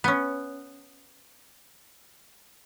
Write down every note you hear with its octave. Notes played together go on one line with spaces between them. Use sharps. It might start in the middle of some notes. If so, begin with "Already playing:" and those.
B3 C#4